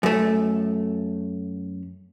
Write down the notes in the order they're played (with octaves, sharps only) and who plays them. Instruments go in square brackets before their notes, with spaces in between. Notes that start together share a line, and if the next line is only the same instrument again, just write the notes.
[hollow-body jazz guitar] F#2 A3